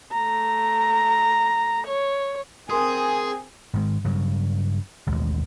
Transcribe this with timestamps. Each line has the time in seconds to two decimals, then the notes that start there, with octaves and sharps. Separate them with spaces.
0.12 A3 A#5
1.87 C#5
2.70 C4 G#4 A#4 G#5 C6 D#6
3.74 G#2 D#3 G#3
4.04 G2 C#3 F#3
5.07 A1 D#2 B2 G#3